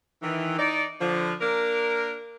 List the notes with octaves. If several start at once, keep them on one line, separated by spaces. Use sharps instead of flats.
D#3 E3
D#4 D5
D3 F3
A#3 D4 A#4